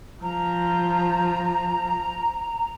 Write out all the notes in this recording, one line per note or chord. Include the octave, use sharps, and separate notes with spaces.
F3 A#5